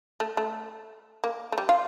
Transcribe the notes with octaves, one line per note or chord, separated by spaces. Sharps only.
A3
A3
A#3
A3
G3
F4